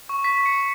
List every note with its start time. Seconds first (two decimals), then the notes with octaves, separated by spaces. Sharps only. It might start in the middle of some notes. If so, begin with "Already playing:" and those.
0.09 C#6
0.24 B6
0.39 C#6
0.46 C#7